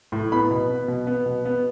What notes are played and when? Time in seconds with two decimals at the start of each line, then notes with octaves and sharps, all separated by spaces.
0.12 A2
0.32 B3 B5
0.51 B2
0.69 B3
0.88 B2
1.07 B3
1.26 B2
1.45 B3